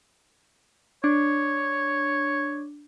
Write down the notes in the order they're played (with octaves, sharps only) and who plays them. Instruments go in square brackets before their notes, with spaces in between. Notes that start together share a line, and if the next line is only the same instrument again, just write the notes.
[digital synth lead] D4 [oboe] C#5